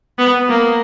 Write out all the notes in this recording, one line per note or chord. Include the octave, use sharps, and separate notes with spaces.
B3
A#3